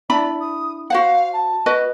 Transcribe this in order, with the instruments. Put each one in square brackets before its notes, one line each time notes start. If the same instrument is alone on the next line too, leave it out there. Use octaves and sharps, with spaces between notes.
[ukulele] D4 E4 B5 [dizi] D5
[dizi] D#6
[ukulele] F#4 C5 F#5 [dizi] F5
[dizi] A5
[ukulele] F#4 B4 D#5